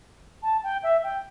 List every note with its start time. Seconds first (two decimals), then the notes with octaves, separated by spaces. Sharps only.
0.43 A5
0.63 G5
0.83 E5
1.04 G5